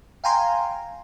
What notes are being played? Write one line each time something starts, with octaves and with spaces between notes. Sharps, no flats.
F5 G5 G#5 A#5 C6